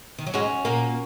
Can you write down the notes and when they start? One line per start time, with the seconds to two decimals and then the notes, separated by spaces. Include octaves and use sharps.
0.18 D#3
0.27 F#3
0.34 G#2 G#3 C#4 F#4
0.65 A#2 A#3